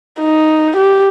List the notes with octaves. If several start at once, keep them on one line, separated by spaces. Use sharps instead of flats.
D#4
G4